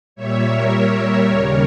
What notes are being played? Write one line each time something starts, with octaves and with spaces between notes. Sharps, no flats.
A#2 G3 C#5 E5
A#4 C#5
D#2 C#3 G3